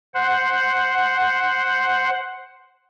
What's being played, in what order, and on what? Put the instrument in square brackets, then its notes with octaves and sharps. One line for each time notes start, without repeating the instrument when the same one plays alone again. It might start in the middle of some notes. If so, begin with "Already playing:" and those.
[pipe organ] C5 F#5